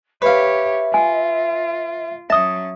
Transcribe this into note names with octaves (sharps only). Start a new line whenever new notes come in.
G4 B4 C#5 E5 F5
F4 G#5
F#3 C#4 E5 A5 D#6